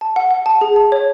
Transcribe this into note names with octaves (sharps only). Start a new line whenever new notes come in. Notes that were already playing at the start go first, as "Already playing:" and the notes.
A5
F#5
F#5
A5
G#4
A5
C#5